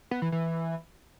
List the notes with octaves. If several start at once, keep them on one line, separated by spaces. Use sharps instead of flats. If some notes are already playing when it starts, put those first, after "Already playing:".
B3
E3
E3